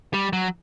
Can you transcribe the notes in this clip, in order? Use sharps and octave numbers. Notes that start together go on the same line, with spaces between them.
G3
F#3